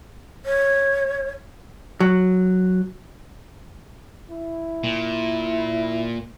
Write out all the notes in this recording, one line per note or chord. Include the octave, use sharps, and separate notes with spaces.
C#5
F#3
E4
A#2